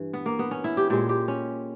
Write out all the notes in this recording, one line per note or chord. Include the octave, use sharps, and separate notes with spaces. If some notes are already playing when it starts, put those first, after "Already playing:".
Already playing: G2 E3
B3
A#3
B3
C#4
E4
G4
A#2 G#3 G4
G4
C#4